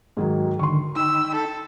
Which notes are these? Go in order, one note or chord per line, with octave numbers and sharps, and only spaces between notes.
G#2 D#3 F#3 G#4
D3 D#3 C6 C#6
D#4 G5 B5 E6
A4